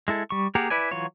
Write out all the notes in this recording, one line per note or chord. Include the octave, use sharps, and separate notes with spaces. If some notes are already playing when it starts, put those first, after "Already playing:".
G#3 E4 A4
G3 C#6
A#3 G4 G#4 A#4 F#5
E4 B4 D5 G#5
E3 F#3 F4 C#5